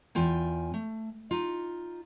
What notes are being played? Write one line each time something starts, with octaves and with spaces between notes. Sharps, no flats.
E2 F4 G5 G#5
A3
D#4 F4